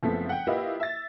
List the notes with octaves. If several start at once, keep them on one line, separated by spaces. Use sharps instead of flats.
F#1 F3 A3 B3 C4 B6
F#5 G5
A#3 E4 F4 G4 B4 D#5
E5 A6